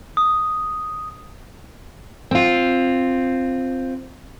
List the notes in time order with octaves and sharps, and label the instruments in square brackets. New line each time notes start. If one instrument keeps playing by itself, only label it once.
[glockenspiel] D#6
[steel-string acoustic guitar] C4 F4